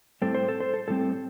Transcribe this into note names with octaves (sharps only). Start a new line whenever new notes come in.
A2 G3 C4 A4
C5
A4
C5
A4
A2 G3 C4 A4